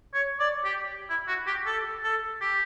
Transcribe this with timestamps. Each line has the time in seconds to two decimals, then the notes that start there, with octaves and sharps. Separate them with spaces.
0.14 C#5
0.40 D5
0.65 G4
1.10 E4
1.28 F#4
1.47 G4
1.66 A4
2.04 A4
2.41 G4